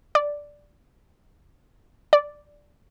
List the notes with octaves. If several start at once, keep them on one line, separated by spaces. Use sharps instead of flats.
D5
D5